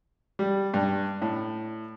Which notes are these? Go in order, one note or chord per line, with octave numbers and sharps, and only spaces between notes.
G3
G2
A2